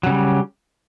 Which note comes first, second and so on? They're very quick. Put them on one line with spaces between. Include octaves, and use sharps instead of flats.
F#3 C#3 G3